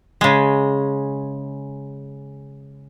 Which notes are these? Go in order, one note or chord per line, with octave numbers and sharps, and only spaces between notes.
C#3 G#3